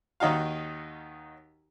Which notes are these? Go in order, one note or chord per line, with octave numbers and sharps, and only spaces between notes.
D#2 D#3 D#4 F#4 F5